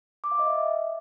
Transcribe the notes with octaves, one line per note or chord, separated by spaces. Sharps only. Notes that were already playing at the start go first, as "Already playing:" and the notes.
D6
F5
D#5
E5